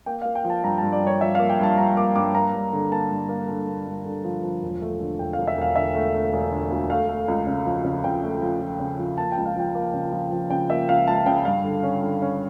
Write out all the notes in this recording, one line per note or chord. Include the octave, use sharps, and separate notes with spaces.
A#3 G5
F5
A#3
G5
F3
A5
G2 A#5
A5
G2
D5
G2 C#5
F3 E5
F5
A#3
G5
G2 A5
G2 A#5
A#3 D6
G2 D6
A#3 A#5
G2
D3
A#3 A5
G2
A#3
D3
A#3
G2
D3
F3
F3
E1
A3
D3
E1 G5
F5
E1
E5
E1 F5
D3 E5
A3
A3
E1
D3
D2
A3 F5
A3
C#2
C#3
F3
C#3
C#3 G5
A3
F3
F3
C#3
F3
A#3 A5
G5
C#2
F5
F3 G5
A#3
C#3
F3
F3
C#3 G5
A#3 E5
C#2 F5
C#2 A5
C#3 G5
G2 F5
D3
C#4
D3
C#4